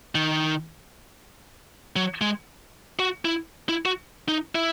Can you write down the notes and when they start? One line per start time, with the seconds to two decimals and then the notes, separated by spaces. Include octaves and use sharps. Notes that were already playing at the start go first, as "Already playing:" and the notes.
0.15 D#3
1.96 F#3
2.21 G#3
2.99 F#4
3.25 E4
3.69 E4
3.86 F#4
4.28 D#4
4.55 E4